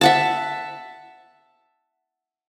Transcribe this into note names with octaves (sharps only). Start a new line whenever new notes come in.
E5 F#5 A5